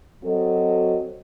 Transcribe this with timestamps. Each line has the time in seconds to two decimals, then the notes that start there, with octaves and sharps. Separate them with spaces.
0.22 F#3 C4 F#4 A4 D#5